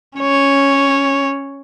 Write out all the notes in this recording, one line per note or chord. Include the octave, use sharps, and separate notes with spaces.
C#4 C#5